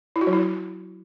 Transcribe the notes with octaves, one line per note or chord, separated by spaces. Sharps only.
E4
F#4
F#3
E4